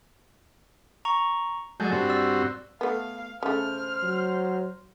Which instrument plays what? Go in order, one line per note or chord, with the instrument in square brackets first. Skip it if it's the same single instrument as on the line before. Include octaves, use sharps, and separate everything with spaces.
[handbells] A#5 C#6
[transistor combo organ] F#3 G#3 A3 [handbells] D5 G6
[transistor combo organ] G2 C4 F#4
[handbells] D5 E6
[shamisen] A3 B3 [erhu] F5
[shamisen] C#3 A3 [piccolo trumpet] C5 [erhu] F6
[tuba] F#3